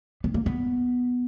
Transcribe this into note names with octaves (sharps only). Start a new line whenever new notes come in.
B3
A#3
B3